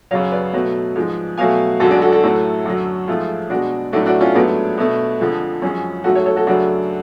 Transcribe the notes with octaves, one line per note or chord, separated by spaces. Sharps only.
F#2 C#3 F#3 C#5 F5
B4 D5
B2 F#3 A3
G#2 F3 G#3
B2 F#3 A3 F5 G#5
F#2 D3 G#3 F#4 A4
D4 F#4
F#4 A4
F#4 A4
A2 F#3 A3
F#2 D3 F#3
G#2 F3 A3 F4 G#4
B2 G#3 D4 F#4
A2 F#3 A3 D4 F#4
D4 F#4
C#4 F4
G#2 F#3 A3 B3 D4
B2 A3
F2 D3 F3 G#3
F#2 F3 G#3 C#4
G#2 F#3 A3 F#4 A4
A4 C#5
A4 C#5
F#4 A4
F#2 C#3 F#3 A3 D4 F#4